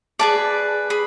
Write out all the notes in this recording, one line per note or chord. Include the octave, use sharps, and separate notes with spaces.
G#4 B4 D5 A5
G#4 B5